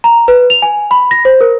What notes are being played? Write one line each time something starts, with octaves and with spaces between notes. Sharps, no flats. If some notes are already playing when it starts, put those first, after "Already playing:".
A#5
B4
F7
G#5
B5
A#6
C5
A#4